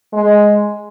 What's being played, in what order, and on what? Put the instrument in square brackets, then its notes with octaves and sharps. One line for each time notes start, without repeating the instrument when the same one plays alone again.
[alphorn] G#3